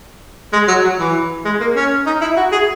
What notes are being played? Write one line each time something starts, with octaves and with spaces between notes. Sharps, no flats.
G#3
F#3
F#3
E3
G#3
A#3
C#4
D#4
E4
F#4
G#4